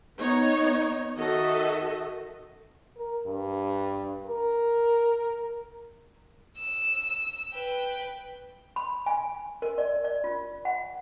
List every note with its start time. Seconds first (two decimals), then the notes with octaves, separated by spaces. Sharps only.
0.17 B3 D#4 C#5
1.16 D#3 F#4 A4 D#5 E5
2.97 A#4
3.25 G2
4.27 A#4
6.58 E6
7.53 B4 G5
8.76 B5
9.06 G#5
9.62 A#4
9.78 D5
10.04 D5
10.24 F4
10.65 F#5